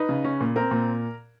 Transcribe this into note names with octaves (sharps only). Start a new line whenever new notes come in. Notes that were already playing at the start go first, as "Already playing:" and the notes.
Already playing: D#4 B4
C#3
C#4
A#2
C4 A#4
A#2